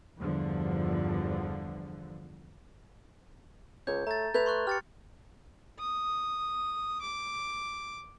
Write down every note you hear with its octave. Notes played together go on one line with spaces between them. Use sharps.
E2 G2 D3 F3
C#2 C#5 G6
A3 A#5 A6
A3 B4 G6 G#6 F7
C6 C#6 F#6
G4 F6 A6 C#7
D#6
D6